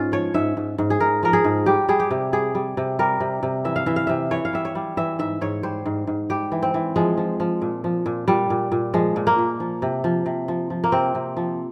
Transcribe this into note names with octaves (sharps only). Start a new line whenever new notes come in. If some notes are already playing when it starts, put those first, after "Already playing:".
Already playing: G#2 C#4 F4
F3 C#5
G#2 E5
G#2
G#2
G#4
G#2 A#4
F3 A#4
G#4
G#2
G3 G4
G3 G#4
G4
C3
G3 G#4
G3
C3
G3 A#4
C3
C3
E3 E5
F5
E3 E5
F5
C3 E5
E3 C#5
F5
G3 E5
C#5
G3
E3 E5
G#2 E5
G#2 C#5
G3 C5
G#2
G#2
G3 G4
E3
C4
E3
F3 G#3
F3
F3
A#2
F3
A#2
A#2 G3
A#2
A#2
F3 G#3
A#2
A#3
A#2
F3
C3
F3
C3
F3
F3
A#3
C3 C4
C3
F3